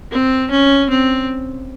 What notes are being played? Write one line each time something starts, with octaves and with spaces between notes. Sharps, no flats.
C4
C#4
C4